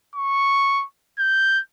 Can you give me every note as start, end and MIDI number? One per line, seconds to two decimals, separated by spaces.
0.15 0.85 85
1.18 1.60 91